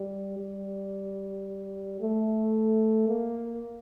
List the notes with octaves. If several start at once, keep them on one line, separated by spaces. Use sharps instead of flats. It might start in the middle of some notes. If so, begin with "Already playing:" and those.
Already playing: G3
G3
A3
A#3